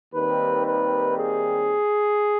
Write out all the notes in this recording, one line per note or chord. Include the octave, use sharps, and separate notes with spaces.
D#2 D#3 G3 C4 B4
B4
G#4